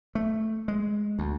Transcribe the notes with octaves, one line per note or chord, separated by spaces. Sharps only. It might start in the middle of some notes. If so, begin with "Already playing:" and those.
A3
G#3
D2